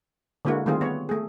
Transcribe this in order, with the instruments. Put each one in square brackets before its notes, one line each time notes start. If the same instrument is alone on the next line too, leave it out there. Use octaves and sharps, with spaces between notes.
[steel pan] D3 G#3 A#3 E4 F#4
D#3 G3 A3 C4 F4 G#4
B3 C#5
A3 G#4